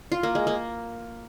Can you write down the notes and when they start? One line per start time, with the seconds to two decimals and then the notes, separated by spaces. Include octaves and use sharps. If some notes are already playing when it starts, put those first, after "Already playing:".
0.12 F4
0.23 A#3
0.35 G#3
0.47 A#3